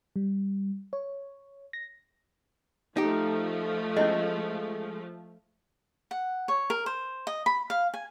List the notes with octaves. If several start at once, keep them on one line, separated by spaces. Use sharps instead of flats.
G3
C#5
A#6
F3 A3 D#4 G4
G#3 C#4 E4 D#5
F#5
C#5
A#4
C5
D#5
B5
F5
G#5